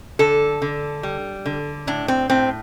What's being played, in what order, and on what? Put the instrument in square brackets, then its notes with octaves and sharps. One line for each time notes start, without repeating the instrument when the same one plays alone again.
[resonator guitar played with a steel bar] D3 A4
D3
G3
D3
A2 D4
C4
A2 C4